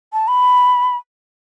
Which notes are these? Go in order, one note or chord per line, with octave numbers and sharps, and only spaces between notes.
A5
B5